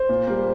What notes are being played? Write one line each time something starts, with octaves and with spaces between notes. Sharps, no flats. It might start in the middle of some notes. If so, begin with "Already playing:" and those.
Already playing: C5
A#2
G3 A#3